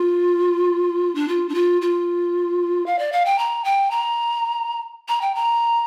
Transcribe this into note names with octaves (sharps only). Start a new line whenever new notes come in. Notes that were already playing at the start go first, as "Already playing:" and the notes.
Already playing: F4
D4
F4
D4
F4
F4
F5
D5
F5
G5
A#5
G5
A#5
A#5
G5
A#5